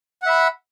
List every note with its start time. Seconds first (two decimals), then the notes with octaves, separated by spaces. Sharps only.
0.22 F#5
0.26 E5
0.30 B5